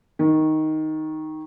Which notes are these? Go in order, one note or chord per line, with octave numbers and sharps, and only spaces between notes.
D#3